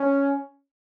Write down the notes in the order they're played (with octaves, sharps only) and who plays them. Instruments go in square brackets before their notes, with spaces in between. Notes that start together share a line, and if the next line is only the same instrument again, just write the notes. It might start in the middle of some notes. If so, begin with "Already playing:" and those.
Already playing: [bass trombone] C#4